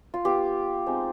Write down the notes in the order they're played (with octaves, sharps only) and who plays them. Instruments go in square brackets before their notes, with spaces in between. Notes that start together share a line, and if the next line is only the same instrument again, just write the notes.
[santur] F4
B3 F4 G4
G#3 C4 D#4